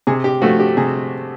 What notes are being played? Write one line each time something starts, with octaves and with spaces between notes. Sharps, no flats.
C3 G#4
G4
F3 A3 F#4
G4
C3 G#4